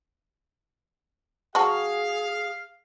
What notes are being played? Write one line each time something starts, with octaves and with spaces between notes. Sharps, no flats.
F#3 F#4 G#4 F5 A5